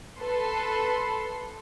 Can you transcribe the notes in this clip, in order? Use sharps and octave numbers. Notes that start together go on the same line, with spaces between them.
A4 B4 C6